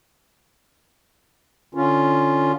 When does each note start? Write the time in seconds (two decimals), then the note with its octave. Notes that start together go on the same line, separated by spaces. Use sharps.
1.75 D3 C#4 F4